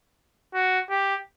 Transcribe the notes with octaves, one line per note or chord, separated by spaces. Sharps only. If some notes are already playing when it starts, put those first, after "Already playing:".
F#4
G4